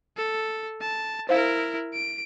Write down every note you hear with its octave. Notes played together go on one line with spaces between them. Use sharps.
A4
A5
E4 A#4 C5 F5
D7